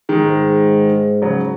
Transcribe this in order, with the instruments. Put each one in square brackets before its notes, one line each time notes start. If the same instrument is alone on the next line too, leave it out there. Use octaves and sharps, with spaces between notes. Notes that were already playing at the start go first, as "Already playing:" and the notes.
[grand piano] D#3 G#3
[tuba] G#2
[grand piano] C#3 F#3